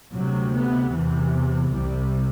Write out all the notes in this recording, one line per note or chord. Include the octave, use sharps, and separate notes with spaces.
D2 C3 F#3
B3
E2 C3 E3
C2 C3 G3